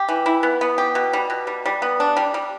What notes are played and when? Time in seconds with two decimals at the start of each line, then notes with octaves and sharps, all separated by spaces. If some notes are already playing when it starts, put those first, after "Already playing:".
Already playing: G4
0.09 E3
0.26 E4
0.43 B3
0.61 B3
0.78 G4
0.95 B2
1.13 G3
1.30 B2
1.47 G3
1.65 G3
1.82 B3
2.00 D4
2.17 G3
2.34 G3